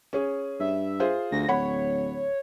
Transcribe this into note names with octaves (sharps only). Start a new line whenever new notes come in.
C#4 G#4
G2 E5
F4 G#4 C5
D2 A#6
D1 C#5 F#5 B5